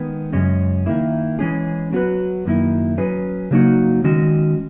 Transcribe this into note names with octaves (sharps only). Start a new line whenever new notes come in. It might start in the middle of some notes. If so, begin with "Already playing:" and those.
Already playing: D#3 G#3 B3
F#2 C#3 G#3 C#4
D#3 A#3 E4
E3 G#3 C#4 G#4
F#3 B3 F#4 B4
F#2 D#3 A#3 E4
F#3 C#4 G#4 B4
C#3 F#3 A#3 D#4 F#4
D#3 G#3 C#4 F#4